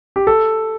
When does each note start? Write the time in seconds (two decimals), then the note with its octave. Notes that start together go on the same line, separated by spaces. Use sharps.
0.16 G4
0.27 A4